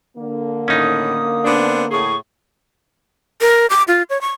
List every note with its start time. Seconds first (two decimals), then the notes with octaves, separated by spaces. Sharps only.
0.18 D3 A#3
0.68 A2 D#3 C#4 D#4 D#6
1.45 B3 C4 D4
1.91 A2 G#4 C#6
3.41 A#4
3.70 D6
3.88 F4
4.10 C#5
4.21 C#6